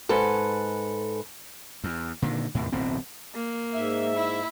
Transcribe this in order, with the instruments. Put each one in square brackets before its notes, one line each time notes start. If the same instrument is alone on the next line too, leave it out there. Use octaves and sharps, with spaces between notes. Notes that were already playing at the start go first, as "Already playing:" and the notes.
[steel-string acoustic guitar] G#2 A4 B4 G#5
[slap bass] E2
A#2 D3 D#3
D#2 A2 C3
D1 A1 B2 C4
[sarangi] A#3
[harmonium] G#2 E5
[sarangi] E4